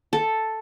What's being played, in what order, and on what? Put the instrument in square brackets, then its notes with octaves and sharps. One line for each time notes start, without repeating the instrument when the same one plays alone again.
[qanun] A4